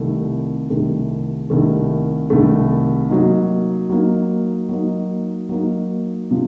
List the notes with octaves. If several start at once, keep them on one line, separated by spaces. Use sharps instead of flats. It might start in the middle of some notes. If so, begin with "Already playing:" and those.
Already playing: C2 C3 D#3 A3
C2 C3 D#3 A3
C2 C3 D#3 A3
C2 C3 D#3 A3
F#3 A#3 D#4
F#3 A#3 D#4
F#3 A#3 D#4
F#3 A#3 D#4
C3 F3